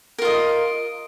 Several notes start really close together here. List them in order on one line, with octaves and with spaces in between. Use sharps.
A#4 F4 D#5